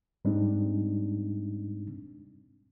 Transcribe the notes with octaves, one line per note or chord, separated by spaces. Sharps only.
G#2 G3 G#3 C4 D4 D#4